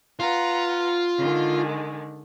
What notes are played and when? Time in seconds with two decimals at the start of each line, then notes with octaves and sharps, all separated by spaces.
0.20 F4 B4 F#5 A#5
1.19 D3 D#3 G#3